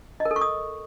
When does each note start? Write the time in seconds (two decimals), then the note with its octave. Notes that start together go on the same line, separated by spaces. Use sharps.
0.20 D#5
0.25 A#4
0.31 A4
0.36 C#6
0.41 D#6